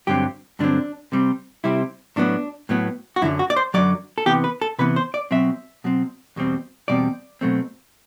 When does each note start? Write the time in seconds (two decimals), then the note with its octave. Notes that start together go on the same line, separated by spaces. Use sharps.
0.07 G2 D3 F#3 C4 G4
0.59 G2 D3 F#3 C4 D4
1.12 C3 G3 C4
1.64 C3 G3 C4 E4
2.16 A2 F#3 B3 D4
2.69 A2 F#3 B3
3.16 F#4
3.22 F#2 D3 F#3 E4
3.39 F#4
3.50 D5
3.56 C5
3.74 F#2 D3 F#3 D5
4.18 A4
4.26 C3 E3 B3 G4
4.44 B4
4.62 A4
4.79 C3 E3 B3 B4
4.96 C5
5.14 D5
5.31 B2 F#3 C4 E5
5.84 B2 F#3 C4
6.36 E2 B2 G3 C4
6.88 E2 B2 G3 C4 D5
7.41 B2 F#3 A3 C4